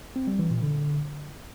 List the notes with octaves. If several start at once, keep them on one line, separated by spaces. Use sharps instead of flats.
C4
G3
E3
A#2
D3